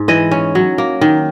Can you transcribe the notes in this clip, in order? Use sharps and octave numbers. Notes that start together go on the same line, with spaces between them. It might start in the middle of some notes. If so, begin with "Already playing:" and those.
Already playing: G#2
E3 D#5
C#4
F#3
A#3
D#3